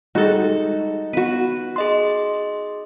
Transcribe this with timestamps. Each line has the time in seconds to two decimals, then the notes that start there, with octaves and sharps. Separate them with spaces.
0.15 G3 G#3 D#4 F#4 A4
1.13 B3 F#4 B4
1.76 G#4 D#5 C6